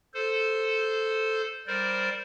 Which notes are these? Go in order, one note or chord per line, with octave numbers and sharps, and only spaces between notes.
A4 C5
G3 A#4 C5 D5